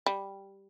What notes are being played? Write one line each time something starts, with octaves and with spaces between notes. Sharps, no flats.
G3